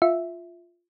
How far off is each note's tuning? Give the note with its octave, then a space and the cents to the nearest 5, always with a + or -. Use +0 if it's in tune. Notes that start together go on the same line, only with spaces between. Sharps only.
F4 +0 E5 +0